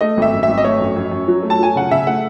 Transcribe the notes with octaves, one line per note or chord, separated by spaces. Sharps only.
A3 D#5
G#1 E5
F#2
E5
G#1
D#5
A3 C#5
F#2
F#2
F#2
F#3
A3
A5
F#3 G#5
C#3 F#5
C#3 E5
A3 F#5